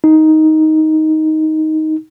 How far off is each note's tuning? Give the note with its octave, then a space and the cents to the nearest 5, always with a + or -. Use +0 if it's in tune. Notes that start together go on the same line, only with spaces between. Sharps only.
D#4 +10